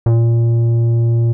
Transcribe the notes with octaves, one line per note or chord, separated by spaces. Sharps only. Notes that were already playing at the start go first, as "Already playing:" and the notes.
A#2